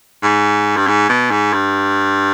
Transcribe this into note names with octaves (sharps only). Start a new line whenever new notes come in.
G#2
G2
G#2
B2
G#2
G2